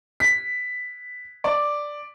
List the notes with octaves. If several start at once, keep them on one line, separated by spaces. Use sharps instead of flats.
B6
D5